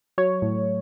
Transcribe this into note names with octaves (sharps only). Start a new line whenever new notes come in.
F#3 C#5
A2